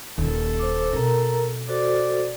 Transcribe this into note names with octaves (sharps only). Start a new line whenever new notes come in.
D#1 D#2 A4
C5 D6
B2 C4 A#4 A#5
F#4 A4 C5 D5